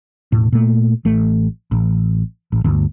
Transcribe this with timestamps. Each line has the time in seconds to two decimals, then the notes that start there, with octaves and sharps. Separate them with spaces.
0.32 E1 A2
0.52 A#2 A3
1.05 A1 A3
1.71 A1
2.52 A1
2.64 G1 D2